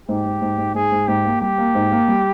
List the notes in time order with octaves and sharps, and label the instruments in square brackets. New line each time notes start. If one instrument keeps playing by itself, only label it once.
[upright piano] G#2 [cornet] G4
[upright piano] G#2
G#2
G#2
[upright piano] G#2 [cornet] G#4
[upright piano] G#2
[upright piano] G#2 [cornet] G4
[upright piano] A#3
[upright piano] G3 [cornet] G4
[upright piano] A#3
G#2
A#3
G3